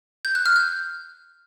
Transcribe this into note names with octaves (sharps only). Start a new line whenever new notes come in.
G6
F#6
F6
G6